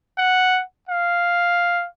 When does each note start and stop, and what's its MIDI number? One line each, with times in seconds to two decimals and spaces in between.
0.18 0.61 78
0.89 1.87 77